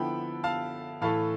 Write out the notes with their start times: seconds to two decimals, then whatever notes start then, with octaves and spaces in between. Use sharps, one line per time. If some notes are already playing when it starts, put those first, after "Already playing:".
Already playing: D3 F3 B3 E4 A4 G5 B5
0.44 F5 A5
1.01 A2 E3 A3 E4 A4 F5 A5